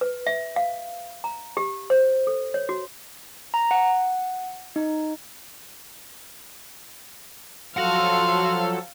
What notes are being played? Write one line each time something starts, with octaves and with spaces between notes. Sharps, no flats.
B4
E5
F5
A#5
G4
C5
A4
C#5
F#4
A#5
F#5
D#4
F3 F#3 F#4 A4 F5 F#5 C6